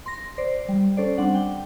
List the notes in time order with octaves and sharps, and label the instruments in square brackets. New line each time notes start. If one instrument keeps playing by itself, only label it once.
[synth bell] C6 A#6
C5 D5
G3
C#4 A4 C5 D5
G3 C4 D4 F#5
G5